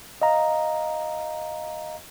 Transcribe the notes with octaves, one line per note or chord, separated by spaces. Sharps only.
D#5 F5 A#5